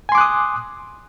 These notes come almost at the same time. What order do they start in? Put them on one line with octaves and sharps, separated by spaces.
G#5 C6 D6 F#6 D#6